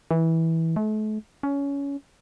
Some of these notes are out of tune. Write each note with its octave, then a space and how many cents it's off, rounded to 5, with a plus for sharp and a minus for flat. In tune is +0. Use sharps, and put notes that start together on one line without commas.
E3 -15
A3 -40
C#4 +20